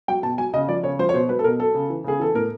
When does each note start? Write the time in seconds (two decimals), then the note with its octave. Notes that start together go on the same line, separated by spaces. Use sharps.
0.08 F#3 G5
0.23 B2 A5
0.38 F#3 G#5
0.54 C#3 D#5
0.69 F3 D5
0.84 C#3 C#5
0.99 F3 C5
1.09 C#5
1.14 B2 C5
1.29 F#3 B4
1.39 A4
1.44 B2 A#4
1.59 F#3 A4
1.75 C#3
1.90 E3
2.04 C#3 G#4
2.20 E3 A4
2.35 A2 A#4